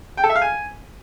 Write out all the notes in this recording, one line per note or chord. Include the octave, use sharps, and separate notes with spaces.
G5
A4
E5
F5
G#5